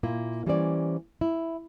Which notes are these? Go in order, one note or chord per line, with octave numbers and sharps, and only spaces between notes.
A#2 A#3 E4 F4
E3 G3 A#3 C#4 C5 D5
E4